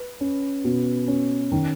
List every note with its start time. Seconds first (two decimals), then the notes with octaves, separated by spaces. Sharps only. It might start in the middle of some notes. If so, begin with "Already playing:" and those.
Already playing: B4
0.20 C#4
0.64 B2
1.08 C#4
1.52 D#3